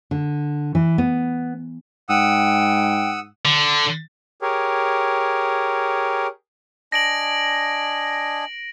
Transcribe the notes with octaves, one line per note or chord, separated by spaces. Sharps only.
D3
E3
B3
G#2 F#5 G5 D#6 E6
D3
G4 G#4 A#4 C#5
D4 D#5 G#5 A#6 D7 F#7